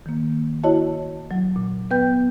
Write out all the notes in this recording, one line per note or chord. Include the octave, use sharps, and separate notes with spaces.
D#3 A#3
E4 F#4 C#5 D#5 A5
F#3
A#2
B3 B4 G5 G6